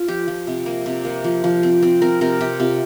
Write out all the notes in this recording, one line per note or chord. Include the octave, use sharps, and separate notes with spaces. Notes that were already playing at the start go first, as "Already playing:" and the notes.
Already playing: F4
F3 G4
F3
C3
A#3
C3
A#3
F3
F3
C4
C4
C4 A#4
C3 A#4
C3 G4
C3 F4